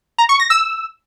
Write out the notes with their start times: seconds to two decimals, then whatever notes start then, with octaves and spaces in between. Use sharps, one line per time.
0.18 A#5
0.29 C#6
0.40 A#6
0.50 E6